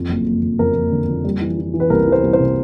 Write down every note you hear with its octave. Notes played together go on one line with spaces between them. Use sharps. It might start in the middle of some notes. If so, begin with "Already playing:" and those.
Already playing: F2
F#1
F#1
F#1
F2 A#4
F2
D3
F2
G3
E3
E3
E3
B4
C2 A#4
E3
C5
C2
C5
C3